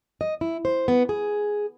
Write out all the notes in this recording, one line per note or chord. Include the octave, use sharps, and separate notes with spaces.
D#5
E4
C5
B3
G#4